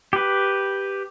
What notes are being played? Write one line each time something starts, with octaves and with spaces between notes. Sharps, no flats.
G4 B4